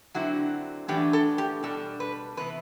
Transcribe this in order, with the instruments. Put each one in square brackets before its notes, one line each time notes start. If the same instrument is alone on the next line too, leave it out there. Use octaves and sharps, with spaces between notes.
[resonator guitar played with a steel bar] D3 F#3 C4 E4 F#4
A2 E3 B3 D4 G4
A4
G4
B2 G3 D4 A4
B4
C3 E3 B3 B4